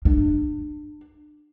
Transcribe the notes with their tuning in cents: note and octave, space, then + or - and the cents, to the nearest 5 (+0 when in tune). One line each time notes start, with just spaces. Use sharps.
D4 +30